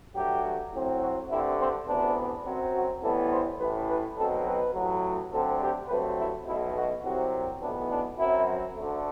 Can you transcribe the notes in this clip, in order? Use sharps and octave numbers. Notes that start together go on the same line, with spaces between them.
G2 F#3 A3 G4
A2 F#3 C4
F#4
G2 D3 A3 C4 E4
C4
D2 C3 E3 B3 D4
F#2 F#3 C4
F#4
A2 E3 G3 B3 A4
C5
A1 A2 E3 B4
B4
B1 B2 F#3 C4 A4
B4
A1 A2 F#3
D2 D3 F#3 C4 A4
G4
G2 F#3 A3 C4 B4
E4
B1 B2 A3 E4
F#4
C2 C3 F#3 C4 F#4
B1 A2 E3 B3 D4
D4
F#2 F#3 C4 E4
D2 D3 A3